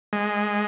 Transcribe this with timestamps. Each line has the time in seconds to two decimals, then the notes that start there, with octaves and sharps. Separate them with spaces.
0.13 G#3